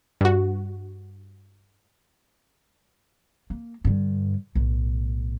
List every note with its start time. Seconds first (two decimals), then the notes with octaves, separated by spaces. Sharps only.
0.21 G2 F#4
3.50 A#3
3.85 G2 D3
4.55 B1 A2